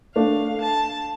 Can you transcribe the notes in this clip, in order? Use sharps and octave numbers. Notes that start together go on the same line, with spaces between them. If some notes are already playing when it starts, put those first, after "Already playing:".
A3 D4 F5
A5